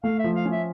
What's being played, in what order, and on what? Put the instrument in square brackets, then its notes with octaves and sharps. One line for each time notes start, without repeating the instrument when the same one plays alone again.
[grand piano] A3 [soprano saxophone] F5
[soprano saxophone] E5
[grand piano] F3
[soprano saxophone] F5
[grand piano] C#4
[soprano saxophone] E5